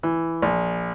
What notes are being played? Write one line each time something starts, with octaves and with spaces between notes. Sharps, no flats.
E3
A#1